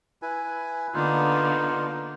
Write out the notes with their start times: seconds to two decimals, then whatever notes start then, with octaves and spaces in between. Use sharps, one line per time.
0.22 E4 B4 G#5
0.94 D3 A#3 B3 D#4 F4